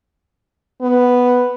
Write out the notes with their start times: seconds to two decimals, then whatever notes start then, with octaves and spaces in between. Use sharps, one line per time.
0.82 B3